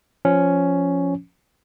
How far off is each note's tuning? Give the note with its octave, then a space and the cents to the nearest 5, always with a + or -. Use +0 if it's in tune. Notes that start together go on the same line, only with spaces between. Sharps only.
F3 +0 C#4 +5